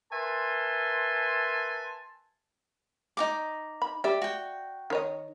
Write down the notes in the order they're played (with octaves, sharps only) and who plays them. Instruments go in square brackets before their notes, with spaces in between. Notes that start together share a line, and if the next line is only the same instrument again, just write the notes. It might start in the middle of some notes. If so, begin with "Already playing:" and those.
[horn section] A#4 B4 E5 G#5 A5 C6
[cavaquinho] D#4 F#4 D6
[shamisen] B5
[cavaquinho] G4 [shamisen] D5 E5
[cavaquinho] F#4 G5
[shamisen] D#3 C#5 D#5